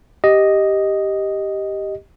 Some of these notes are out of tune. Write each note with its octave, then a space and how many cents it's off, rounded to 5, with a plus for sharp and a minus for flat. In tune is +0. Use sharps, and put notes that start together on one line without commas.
G4 +0 D#5 +0